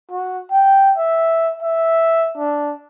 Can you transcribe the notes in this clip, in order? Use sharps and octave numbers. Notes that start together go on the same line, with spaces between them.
F#4
G5
E5
E5
D4